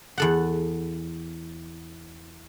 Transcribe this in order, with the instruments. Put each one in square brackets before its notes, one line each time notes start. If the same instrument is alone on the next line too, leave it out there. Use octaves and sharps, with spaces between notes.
[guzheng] E2 A4 F#5